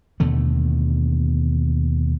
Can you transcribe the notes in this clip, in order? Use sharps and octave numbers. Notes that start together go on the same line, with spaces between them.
D#2 B2 D3 A3